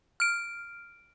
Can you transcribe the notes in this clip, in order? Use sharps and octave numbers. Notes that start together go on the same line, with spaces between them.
F6 D7